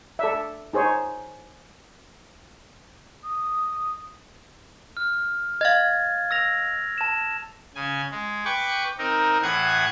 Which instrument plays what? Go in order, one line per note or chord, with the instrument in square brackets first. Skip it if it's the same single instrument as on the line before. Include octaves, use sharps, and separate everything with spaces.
[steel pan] A4 D5 E5
D#4 G#4 C5 C#5
[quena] D#6
[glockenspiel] F6
[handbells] D#5 F5 [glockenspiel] G#6 A6
[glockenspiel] E6 A#6 F7
A5 E7
[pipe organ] C#3 G#5
G#3
B4 G5 C#6 D6
C4 D#4 A#4
A2 E3 G#4 F#5 F#6 G#6